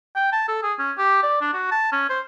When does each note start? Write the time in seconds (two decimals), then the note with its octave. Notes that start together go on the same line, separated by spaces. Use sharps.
0.16 G5
0.33 A5
0.48 A4
0.63 G#4
0.79 C#4
0.98 G4
1.23 D5
1.42 D4
1.54 F#4
1.72 A5
1.93 C#4
2.09 C5